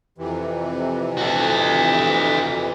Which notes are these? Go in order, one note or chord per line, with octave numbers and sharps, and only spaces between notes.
F2 C3 E3
F#4 A4